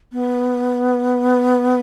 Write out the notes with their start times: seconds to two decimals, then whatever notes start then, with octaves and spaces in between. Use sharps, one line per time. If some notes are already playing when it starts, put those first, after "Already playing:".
0.12 B3